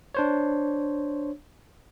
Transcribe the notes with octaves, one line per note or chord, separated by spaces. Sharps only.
D4 C5 C#5